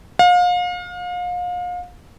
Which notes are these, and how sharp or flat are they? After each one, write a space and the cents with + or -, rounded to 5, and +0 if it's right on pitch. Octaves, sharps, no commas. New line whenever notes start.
F5 +35